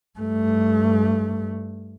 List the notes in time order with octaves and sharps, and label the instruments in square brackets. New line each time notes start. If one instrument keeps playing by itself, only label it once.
[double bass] G2 A3